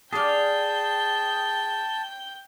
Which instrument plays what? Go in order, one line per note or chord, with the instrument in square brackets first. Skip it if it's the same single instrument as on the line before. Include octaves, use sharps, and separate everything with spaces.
[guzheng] G4 D5 [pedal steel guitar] G#4 F5 [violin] G5 G6 [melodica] A5